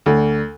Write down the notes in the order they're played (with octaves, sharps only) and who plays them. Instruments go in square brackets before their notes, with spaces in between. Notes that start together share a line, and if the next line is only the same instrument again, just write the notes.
[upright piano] D2